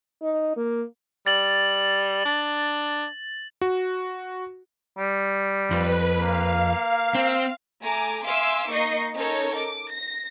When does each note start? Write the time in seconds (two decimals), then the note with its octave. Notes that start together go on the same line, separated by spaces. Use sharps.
0.22 D#4
0.57 A#3
1.26 G3 A6 F#7
2.25 D4
3.61 F#4
4.98 G3
5.71 F2 B4
6.18 A#3 F5
7.15 C4
7.82 A3 G#5 A#5 D6
8.24 E5 F5 G#5 C6 D6 E6
8.70 A#3 D#4 D#5 C#6 C7
9.14 C#4 D#4 A4 A#4 C#5
9.56 D6
9.90 A#6